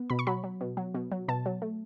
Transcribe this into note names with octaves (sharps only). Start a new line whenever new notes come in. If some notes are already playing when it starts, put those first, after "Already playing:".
Already playing: B3
B2 B5
C#6
F#3 B5
F#3
B2
F#3
B2
F#3
B2 A5
F#3
A3